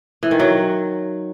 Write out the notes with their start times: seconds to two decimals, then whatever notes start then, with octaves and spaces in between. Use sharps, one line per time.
0.23 E3
0.31 D#3
0.40 F#3